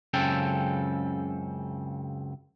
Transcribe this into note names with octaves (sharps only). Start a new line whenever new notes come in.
C#2 F#2 C#3 C4 A4 G5